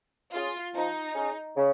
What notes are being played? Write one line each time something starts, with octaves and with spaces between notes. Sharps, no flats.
C#4 F4 G#4
F3 D#4
C#4 G#4
C#3